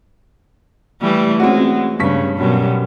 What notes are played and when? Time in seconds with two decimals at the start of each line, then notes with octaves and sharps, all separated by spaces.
1.01 E3 G3 A3
1.40 G#3 C4 C#4 F#4
1.99 G2 C#3 C#6 B6
2.38 F#2 B2 G3